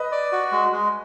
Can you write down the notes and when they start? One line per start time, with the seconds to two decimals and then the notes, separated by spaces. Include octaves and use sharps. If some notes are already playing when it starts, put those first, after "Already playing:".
Already playing: B4 D#5
0.12 D5
0.32 F#4
0.52 G#3
0.72 G#3